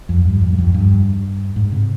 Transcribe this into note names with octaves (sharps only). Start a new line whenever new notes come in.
F2
G2
F2
G2
F2
G2
G#2
C3